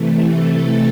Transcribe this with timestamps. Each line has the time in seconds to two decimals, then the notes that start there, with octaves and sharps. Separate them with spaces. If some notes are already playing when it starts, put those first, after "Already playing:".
Already playing: C3 E3 A3
0.33 A4